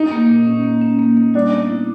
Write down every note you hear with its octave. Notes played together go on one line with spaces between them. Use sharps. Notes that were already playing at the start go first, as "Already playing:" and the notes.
Already playing: D#4
A#3
A#2
C#4
A#3
C#4
A#3
A#3
G3 D4
B3
E4